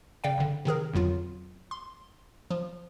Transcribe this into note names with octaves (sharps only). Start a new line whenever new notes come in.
C#3 D5 F5 G5
G1 D3
C3 D#3 G#4 A#4
G1 F2 F#3 F4
C6
F3